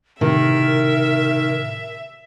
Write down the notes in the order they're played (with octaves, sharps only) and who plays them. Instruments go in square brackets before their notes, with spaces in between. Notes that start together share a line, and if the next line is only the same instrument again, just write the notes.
[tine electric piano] A2 C3 [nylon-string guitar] D#3 [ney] A#4 [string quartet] E5